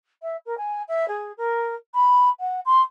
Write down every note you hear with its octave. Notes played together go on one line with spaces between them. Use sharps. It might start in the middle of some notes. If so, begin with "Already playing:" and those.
E5
A#4
G#5
E5
G#4
A#4
B5
F#5
C6